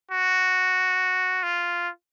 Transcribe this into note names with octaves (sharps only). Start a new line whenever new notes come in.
F#4
F4